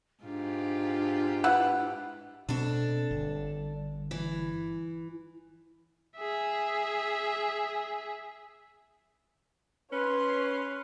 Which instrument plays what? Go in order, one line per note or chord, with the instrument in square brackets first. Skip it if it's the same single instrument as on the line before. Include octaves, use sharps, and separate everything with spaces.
[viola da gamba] G#2 F4 G4 [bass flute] D4
[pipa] E4 B4 F#5
[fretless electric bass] B2 C4 [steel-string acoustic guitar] D4 A4
[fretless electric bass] G1
[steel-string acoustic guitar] E3
[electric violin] G#4 E5
[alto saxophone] C#4 [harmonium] B4 [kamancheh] C#5 C6